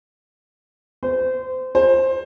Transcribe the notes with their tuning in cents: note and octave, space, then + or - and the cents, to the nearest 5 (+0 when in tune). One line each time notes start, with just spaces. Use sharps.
C5 -25
C5 +15